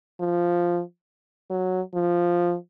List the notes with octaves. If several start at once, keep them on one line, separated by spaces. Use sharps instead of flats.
F3
F#3
F3